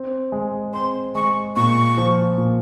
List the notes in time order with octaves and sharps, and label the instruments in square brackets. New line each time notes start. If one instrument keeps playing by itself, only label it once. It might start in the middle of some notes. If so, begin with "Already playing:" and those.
Already playing: [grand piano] C4
G#3
[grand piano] C4 [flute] C6
[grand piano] G#3 [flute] C#6
[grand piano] A#2 [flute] C#6
[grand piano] F3
A#2